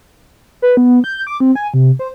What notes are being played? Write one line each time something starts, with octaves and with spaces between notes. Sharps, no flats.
B4
B3
G6
D6
C4
G#5
C3
C5